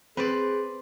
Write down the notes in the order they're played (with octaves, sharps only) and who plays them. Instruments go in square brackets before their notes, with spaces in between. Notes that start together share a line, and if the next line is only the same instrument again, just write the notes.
[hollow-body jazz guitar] C4 [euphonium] G#4 [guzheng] B4 C5 D5